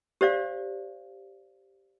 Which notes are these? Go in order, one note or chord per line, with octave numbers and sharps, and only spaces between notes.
G4 C5 D5 F5